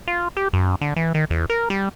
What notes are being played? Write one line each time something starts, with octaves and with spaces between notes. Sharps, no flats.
F4
G4
F#2
D3
E3
D#3
E2
A#4
G3